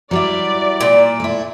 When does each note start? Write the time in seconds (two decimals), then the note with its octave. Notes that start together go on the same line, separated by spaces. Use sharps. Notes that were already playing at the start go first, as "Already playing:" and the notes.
0.11 F#3 G3 E4 D5
0.80 A#2
1.20 A3 E4